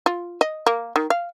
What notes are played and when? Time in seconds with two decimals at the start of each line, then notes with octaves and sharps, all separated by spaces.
0.06 F4
0.41 D#5
0.67 A#3
0.96 D#3
1.10 F5